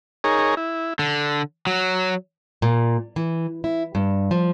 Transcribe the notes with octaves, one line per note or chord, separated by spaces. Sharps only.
D#4 G#4 A#4 C#5
E4
D3
F#3
A#2
E3
E4
G2
F3